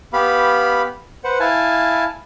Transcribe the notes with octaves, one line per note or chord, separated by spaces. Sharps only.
B3 G4 F5 B5
B4 C5 F#5
E4 F5 G#5 A5